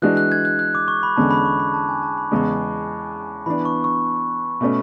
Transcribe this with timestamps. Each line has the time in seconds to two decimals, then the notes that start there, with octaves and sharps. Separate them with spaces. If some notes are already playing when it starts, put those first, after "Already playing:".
0.02 E3 G#3 D4 F#4 F#6
0.17 F#6
0.32 G#6
0.45 F#6
0.59 F#6
0.75 D6
0.88 C#6
1.03 B5
1.16 E2 D3 G#3 C#4 A5
1.31 B5
1.45 C#6
1.60 B5
1.74 A5
1.89 G#5
2.02 A5
2.18 B5
2.31 E2 C#3 G#3
3.46 E3 B3 D4 B5
3.65 C#6
3.84 C#6
4.61 B2 A3 C#4